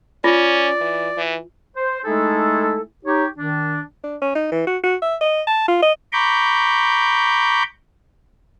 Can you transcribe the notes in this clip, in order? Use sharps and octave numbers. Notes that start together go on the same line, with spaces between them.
C#4 F4 D5
E3
E3
C5
G#3 A3 D#4 E4 G#4 A4
D#4 G4 C#5
D#3 D4
D4
C#4
D#4
E3
F#4
F#4
E5
D#5
A5
F4
D#5
A#5 B5 C#6 D6 G6